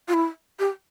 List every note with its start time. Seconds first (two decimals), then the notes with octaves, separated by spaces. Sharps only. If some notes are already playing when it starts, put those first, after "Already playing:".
0.08 F4
0.14 E4
0.59 G4